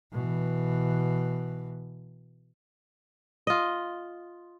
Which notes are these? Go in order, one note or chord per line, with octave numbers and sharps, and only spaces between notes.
B2 E3
F4 D#5